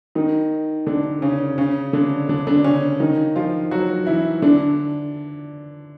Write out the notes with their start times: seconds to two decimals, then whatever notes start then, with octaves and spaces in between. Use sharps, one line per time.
0.15 D#3 D#4
0.87 D3 D4
1.22 C#3 C#4
1.58 C#3 C#4
1.93 D3 D4
2.29 D3 D4
2.47 D3 D4
2.64 C#3 C#4
3.00 D#3 D#4
3.36 F3 F4
3.71 F#3 F#4
4.07 E3 E4
4.42 D3 D4